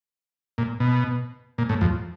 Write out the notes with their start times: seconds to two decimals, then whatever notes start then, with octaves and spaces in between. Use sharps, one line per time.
0.58 A#2
0.80 B2
1.58 A#2
1.69 A2
1.81 F2